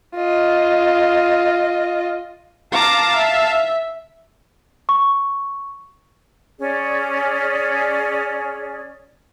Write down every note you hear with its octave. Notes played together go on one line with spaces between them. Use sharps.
F4 D#5
F5 A5 A#5 D6
E5
C#6
C#4 G#4 D5